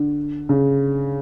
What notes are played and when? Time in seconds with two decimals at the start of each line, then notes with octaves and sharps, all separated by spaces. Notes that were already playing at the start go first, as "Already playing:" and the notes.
Already playing: D3
0.49 C#3